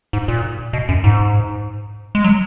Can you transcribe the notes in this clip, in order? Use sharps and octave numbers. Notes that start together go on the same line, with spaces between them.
G#2
A#2
B2
F#2
G#2
G#3
F#3